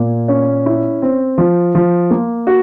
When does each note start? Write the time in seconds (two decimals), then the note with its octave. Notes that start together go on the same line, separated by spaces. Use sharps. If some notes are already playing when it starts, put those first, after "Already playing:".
Already playing: A#2 A#3
0.28 C#4
0.66 E4
1.02 C4
1.38 F3
1.75 F3
2.10 A#3
2.47 F#4